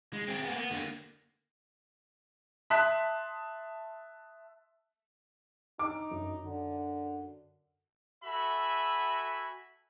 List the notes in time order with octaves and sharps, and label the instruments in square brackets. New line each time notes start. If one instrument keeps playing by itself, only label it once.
[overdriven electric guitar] G#3
C4 G#4
A#3 B3
B3
D3 A#3
[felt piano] E5 A5 C6 D#6 F#6 B6
[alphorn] D#4 [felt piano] D6
[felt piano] F#2
[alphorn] D3
[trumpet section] F#4 A4 E5 G#5 B5